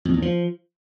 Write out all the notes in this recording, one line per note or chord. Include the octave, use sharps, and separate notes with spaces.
F2
E2
F3